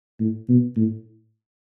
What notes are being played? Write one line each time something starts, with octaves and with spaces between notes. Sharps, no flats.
A2
B2
A2